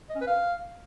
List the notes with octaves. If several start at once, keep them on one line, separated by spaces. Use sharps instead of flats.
D#5
C#4
B4
F5